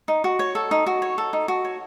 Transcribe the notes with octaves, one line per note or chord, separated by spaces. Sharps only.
D#4
F#4
C#5
A4
D#4
F#4
C#5
A4
D#4
F#4
C#5